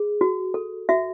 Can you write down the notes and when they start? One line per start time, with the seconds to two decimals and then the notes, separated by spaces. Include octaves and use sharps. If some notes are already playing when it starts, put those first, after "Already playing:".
Already playing: G#4
0.21 F#4
0.54 A4
0.89 F#4 E5